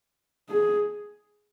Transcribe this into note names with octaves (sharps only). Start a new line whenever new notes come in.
G#4